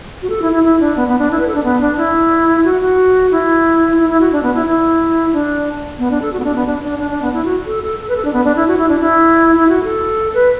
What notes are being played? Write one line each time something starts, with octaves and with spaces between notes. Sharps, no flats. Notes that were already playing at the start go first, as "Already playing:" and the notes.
F#4
A4
E4
E4
E4
D4
B3
B3
D4
E4
B4
A4
D4
B3
D4
E4
F#4
F#4
E4
E4
E4
F#4
D4
B3
E4
E4
D4
B3
D4
A4
F#4
B3
D4
B3
D4
D4
D4
D4
B3
E4
F#4
A4
A4
A4
B4
A4
D4
B3
D4
E4
F#4
E4
D4
E4
E4
F#4
A4
B4